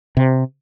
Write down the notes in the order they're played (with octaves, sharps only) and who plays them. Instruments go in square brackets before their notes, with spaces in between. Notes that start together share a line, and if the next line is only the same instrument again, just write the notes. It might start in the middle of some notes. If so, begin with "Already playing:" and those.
[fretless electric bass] C3